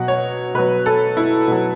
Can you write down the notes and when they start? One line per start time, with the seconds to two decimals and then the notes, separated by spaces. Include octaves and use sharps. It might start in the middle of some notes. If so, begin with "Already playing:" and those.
Already playing: B2 F#3 F#5
0.08 C#5
0.54 B2 F#3 B4
0.86 A4
1.17 E4
1.48 B2 F#3